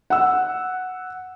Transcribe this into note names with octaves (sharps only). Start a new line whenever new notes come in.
F#5 E6